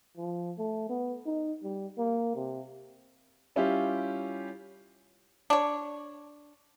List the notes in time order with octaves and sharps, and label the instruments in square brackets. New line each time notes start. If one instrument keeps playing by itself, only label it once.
[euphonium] F3
A3
B3
D#4
G3
A#3
C3
[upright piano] G3 C#4 E4 F4 G4
[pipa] D4 C#5